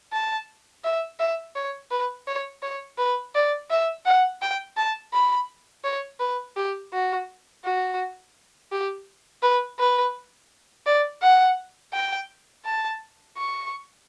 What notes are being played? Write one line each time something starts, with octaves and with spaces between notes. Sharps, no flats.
A5
E5
E5
C#5
B4
C#5
C#5
B4
D5
E5
F#5
G5
A5
B5
C#5
B4
G4
F#4
F#4
G4
B4
B4
D5
F#5
G5
A5
C#6